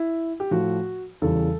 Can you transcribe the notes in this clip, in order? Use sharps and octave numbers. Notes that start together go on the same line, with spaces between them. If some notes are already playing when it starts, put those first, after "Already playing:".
Already playing: E4
G4
A2 F3 F#4
E2 C#3 E3 G3 A4